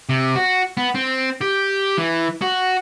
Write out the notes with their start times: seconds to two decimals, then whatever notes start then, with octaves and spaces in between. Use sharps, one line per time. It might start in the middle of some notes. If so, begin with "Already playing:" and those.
0.09 C3
0.36 F#4
0.77 B3
0.95 C4
1.41 G4
1.98 E3
2.42 F#4